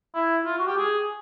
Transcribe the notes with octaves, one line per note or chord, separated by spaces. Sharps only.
E4
F4
F#4
G4
G#4